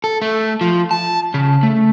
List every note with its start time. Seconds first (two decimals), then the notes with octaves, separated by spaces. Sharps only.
0.04 A4
0.22 A3
0.61 F3
0.91 A5
1.34 C#3
1.63 A3